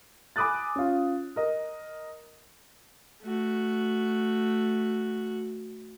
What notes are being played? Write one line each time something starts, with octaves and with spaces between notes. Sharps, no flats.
G#5 B5 D6 D#6 F#6 A6
C#4 F4
A#4 D#5
A3 F#4